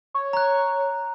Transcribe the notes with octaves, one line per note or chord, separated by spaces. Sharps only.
C#5
A#5 F#6